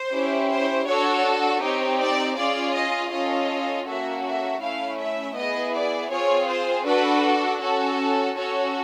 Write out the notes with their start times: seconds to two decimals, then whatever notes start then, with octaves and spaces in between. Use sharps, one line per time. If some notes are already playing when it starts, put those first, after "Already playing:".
Already playing: C5
0.12 C#4 E4 G4
0.50 C5
0.86 D4 F#4 A4 C#5
1.61 C4 D#4 G4 C#5
2.00 D5
2.36 C#4 F4 G#4 D5
2.74 D#5
3.11 C#4 F4 A4 D#5
3.86 A#3 C#4 F#4 A4 E5
4.24 E5
4.61 A3 C#4 E4 F5
4.98 E5
5.35 B3 E4 G#4 D#5
5.74 D5
6.10 C4 F4 G#4 C#5
6.48 C5
6.85 D4 F#4 A4 B4
7.61 C#4 F#4 A4
8.35 C#4 F#4 A4 C#5